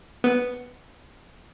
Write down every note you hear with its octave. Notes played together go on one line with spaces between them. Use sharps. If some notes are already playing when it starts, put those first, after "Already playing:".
B3